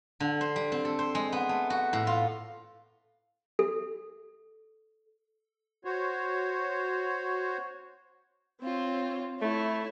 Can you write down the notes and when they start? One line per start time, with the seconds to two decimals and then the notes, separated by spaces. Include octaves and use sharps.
0.20 D3
0.41 C5
0.56 G3
0.72 C4
0.85 A4
0.99 C5
1.15 G#3
1.32 B3
1.49 A3
1.70 F#4
1.93 A2
2.07 F4
3.59 A4
5.85 F#4 C5 C#5
8.61 C4 F4 C#5
9.42 A3 E4 C#5